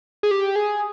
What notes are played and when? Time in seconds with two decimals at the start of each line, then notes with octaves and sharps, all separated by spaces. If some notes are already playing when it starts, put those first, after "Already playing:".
0.23 G#4
0.31 G4
0.56 G#4